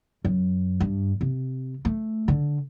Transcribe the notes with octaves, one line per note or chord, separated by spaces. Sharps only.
F#2
G2
C3
A3
D3